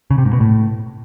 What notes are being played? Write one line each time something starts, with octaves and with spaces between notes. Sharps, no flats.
C#3
C3
G#2
B2
A2